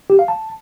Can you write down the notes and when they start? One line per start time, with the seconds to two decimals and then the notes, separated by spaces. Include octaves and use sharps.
0.10 G4
0.19 F5
0.28 A5